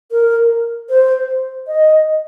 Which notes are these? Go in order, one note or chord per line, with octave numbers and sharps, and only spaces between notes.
A#4
C5
D#5